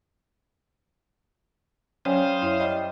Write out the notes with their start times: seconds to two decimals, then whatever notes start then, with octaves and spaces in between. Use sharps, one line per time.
2.05 F#3 G3 C#4 C5 C#5 F5 G#5 D#6
2.42 F#2 E4 C#5 E5
2.60 G3 D#5